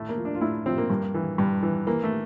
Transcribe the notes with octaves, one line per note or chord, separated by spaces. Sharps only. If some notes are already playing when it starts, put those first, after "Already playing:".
Already playing: A2 A3
A#3
F3
D4
F4
A2 E4
F3 C4
A#3
G2
E3
G2
E3
E3 A#3
A3